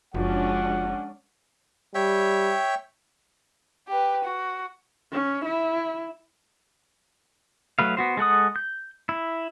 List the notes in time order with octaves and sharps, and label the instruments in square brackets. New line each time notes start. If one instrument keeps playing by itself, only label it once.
[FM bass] F#1 [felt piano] F3 F#4 [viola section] G#3 C#4 D4 [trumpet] F#5
[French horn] G3 [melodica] C#5 E5 G5
[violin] G4 B4
F#4
[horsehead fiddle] C#4
E4
[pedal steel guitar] F#3 A3 B4 F5
B3 F#4 C5
G#3 A4 F#5 D#6
G6
E4